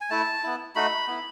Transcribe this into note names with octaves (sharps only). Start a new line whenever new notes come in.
G#5
A3 E4 A5
B3 E4
A3 D#4 F#4 B5
B3 E4